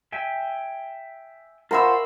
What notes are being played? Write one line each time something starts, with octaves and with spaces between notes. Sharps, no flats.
E5 G5 G#5 E6
F4 A#4 C5 F#5 G#5 B5 C#6 E6